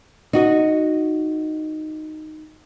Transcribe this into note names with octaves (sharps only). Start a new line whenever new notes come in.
D#4 F#4 D#5